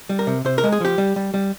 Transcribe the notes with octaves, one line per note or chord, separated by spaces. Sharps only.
G3
A#4
C3
C3 C5
A#4
G#3
G#4
F3 G4
G3
G3
G3